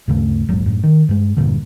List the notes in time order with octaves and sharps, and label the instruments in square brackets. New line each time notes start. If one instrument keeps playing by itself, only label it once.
[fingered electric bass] D2 G2 C#3 A3
E1 A#1 G#2 F#3
F#2 A2
D#3
G2 G#3
E1 G2 A#2 D3